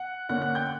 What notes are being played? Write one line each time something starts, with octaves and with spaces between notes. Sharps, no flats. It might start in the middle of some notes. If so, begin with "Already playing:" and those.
Already playing: F#5 F#6
D3 A#3 C#4 F#5 F#6
F#5 F#6
G5 G6